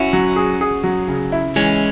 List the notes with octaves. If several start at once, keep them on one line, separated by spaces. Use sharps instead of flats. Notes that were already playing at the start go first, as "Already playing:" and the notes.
Already playing: C#4 E4 F#4
F#3
G#4
G#4
F#3
C#3
E4
E3 G#3 C#4